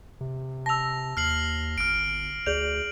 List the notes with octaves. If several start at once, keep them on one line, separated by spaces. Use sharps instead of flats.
C3
A5 E6 A#6 F7
D#2 F6 C7 F#7
G1 F6 D7
D2 G#4 D5 G6 F7 F#7